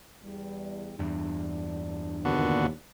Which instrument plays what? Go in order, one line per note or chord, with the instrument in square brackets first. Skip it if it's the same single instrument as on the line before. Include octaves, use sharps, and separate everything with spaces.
[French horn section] E2 G3
[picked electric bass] E2 G2 [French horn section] D4
[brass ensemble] D#2 A#2 [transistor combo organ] D3 B3 F#4